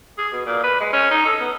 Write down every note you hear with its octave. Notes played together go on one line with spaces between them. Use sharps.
G#4
B2
A#2
B4
G#3
C#4
D#4
A4
B3